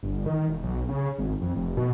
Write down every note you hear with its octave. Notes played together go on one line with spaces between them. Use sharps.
G1
D#3
E1
B1
C#3
G#1
F2
F1
B2